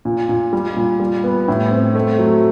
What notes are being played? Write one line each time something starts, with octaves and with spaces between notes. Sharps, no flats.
A#2
A#2
G3
A#2
G3
B3
A2
C4
A3
F#3